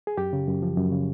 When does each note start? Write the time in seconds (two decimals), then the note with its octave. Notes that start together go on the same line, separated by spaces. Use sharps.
0.07 G#4
0.18 F#2 G4
0.33 C#3
0.48 F#2
0.62 F3
0.77 F#2
0.92 C#3